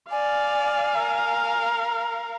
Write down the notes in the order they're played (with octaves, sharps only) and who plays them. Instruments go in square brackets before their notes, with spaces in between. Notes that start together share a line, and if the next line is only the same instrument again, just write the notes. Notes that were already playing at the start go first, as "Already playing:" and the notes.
[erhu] D5 [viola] F5 [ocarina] G#5
[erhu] A#4